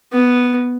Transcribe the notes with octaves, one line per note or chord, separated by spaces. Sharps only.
B3